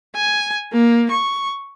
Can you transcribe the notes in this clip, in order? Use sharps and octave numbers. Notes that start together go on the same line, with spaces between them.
G#5
A#3
C#6